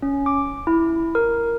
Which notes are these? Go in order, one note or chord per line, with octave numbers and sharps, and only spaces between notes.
C#4
D6
E4
A#4